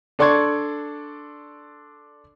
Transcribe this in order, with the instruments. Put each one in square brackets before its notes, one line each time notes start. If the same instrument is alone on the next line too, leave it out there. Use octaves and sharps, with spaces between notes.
[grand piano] D4 A4 D5 C6 C#6 G#6